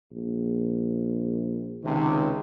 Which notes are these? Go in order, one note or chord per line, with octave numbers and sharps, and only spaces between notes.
A#1
C#2 C3 D#3